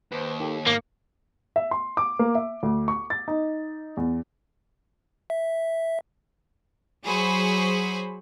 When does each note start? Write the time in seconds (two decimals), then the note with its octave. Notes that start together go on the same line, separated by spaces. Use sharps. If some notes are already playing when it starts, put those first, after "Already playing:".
0.12 D#2 B4 C5
0.40 D#3 G4 A4
0.67 G#2 A#3 D6 C#7
1.56 E5
1.71 C6
1.97 D6
2.19 A#3
2.35 E5
2.63 D2
2.88 C#6
3.10 A6
3.28 D#4
3.97 E2
5.30 E5
7.03 F#3 G#4 C5 B5 C#6